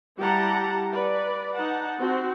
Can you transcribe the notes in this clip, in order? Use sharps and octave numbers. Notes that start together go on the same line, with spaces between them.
G3 E4 G4 F#5 A5 A#5
B4 D5
D#4 F#5 A5
C4 F#4